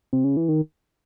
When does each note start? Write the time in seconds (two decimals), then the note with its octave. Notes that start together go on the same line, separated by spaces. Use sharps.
0.13 C3
0.24 C#3
0.37 E3
0.49 D#3